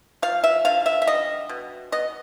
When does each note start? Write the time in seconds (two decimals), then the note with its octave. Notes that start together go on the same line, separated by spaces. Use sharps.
0.22 F3 F5
0.44 E5
0.65 D3 F5
0.86 E5
1.02 E5
1.07 G3 D#5
1.49 B2
1.92 B3 D#5